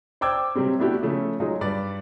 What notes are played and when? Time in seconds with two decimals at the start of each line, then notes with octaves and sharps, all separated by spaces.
0.21 C5 D5 G5 D6 E6 G#6
0.55 C3 F#3 G3 C4
0.79 A3 B3 D4 E4 F#4 G4
1.03 C#3 F3 A3 A4
1.40 F#3 G#3 D#4 F4
1.61 G2 B4 D5